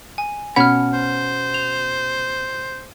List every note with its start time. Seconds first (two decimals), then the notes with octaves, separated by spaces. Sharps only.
0.18 G#5
0.56 B2 C#4 F#5 B5 F6
0.94 C5
1.54 F7